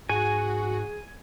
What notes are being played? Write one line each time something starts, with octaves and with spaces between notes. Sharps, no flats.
G#2 F#4 G#4 G#5